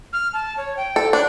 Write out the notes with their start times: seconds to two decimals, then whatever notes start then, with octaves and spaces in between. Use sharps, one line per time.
0.13 F6
0.33 A5
0.57 C#5
0.77 G5
0.96 A4
1.13 D4 F#6